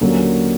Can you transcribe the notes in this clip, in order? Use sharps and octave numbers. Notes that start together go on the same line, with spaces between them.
D#2 D3 F#3 A#3 C#4